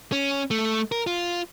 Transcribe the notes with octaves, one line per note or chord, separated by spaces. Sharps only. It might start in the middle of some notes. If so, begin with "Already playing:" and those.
C#4
A3
A#4
F4